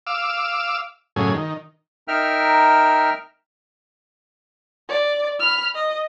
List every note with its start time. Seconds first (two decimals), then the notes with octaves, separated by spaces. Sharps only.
0.07 F5 D6 E6
1.16 F#2 A2 C#3 G#4
1.34 D#3
2.08 D#4 A#4 E5 G5 F6
4.89 D5
5.40 B5 F6
5.75 D#5